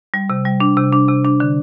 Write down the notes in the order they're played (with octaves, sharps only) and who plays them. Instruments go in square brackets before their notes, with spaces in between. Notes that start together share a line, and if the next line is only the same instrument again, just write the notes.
[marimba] G3
C3
G3
D4
C3
D4
C3
D4
D3